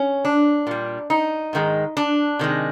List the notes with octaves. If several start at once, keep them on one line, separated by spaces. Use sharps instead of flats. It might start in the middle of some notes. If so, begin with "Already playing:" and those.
Already playing: C#4
D4
A#2 G3
D#4
G#2 D#3 G#3
D4
C3 D#3 G#3